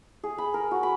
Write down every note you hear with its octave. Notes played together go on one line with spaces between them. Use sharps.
G#4
B5
A#4
F#4
B5